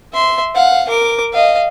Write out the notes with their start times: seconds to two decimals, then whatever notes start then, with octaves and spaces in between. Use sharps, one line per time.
0.13 E5 C6
0.55 F5 F#5
0.88 A#4 D6
1.33 D#5 F5